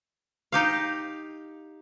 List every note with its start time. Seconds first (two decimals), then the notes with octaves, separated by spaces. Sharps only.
0.52 D#4 G4 F5